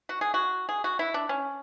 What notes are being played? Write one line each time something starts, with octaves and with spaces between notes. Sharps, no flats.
F#4
G#4
F#4
G#4
F#4
E4
D4
C#4